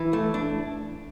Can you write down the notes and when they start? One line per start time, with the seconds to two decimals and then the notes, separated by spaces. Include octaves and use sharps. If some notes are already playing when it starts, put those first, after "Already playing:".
Already playing: E3
0.13 A3
0.34 D4